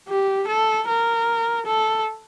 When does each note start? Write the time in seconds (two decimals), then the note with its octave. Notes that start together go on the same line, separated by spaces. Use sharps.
0.09 G4
0.48 A4
0.88 A#4
1.66 A4